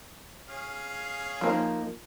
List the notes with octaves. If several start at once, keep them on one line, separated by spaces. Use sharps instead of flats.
C#4 G#4 F5
F3 A#3 D#4